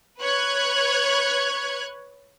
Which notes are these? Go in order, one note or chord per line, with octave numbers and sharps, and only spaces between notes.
B4 C#5 F#6 G#6